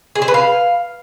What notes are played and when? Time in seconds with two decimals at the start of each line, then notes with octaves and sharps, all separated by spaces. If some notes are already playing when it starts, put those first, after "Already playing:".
0.15 G#4
0.22 C5
0.28 B4
0.34 F5